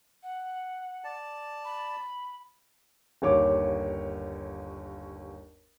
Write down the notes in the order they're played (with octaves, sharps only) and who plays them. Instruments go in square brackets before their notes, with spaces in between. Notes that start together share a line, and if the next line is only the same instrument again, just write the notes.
[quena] F#5
[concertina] D5 A5
[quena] B5
[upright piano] G1 D#2 C#5 D6